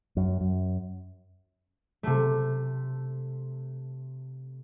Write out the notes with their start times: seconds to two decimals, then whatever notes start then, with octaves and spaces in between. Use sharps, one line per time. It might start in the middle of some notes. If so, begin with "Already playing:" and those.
0.17 F#2
0.41 F#2
2.03 C3 A3